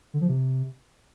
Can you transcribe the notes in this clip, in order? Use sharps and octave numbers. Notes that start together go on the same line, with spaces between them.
D3
F3
C3